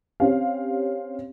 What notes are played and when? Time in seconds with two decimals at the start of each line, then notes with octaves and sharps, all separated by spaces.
0.20 C4 C#4 G4 F5